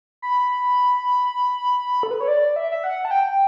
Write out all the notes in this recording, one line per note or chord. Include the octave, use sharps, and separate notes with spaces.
B5
A4
B4
C#5
D5
E5
E5
F#5
A5
G5